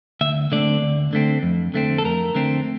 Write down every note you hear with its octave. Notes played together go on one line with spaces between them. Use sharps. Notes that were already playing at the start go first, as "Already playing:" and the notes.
D2 E5
D3 A3 C4 D5
D2
D3 A3 C4
F2
D3 A3 C4
A4
F2 A#4
D3 A3 C4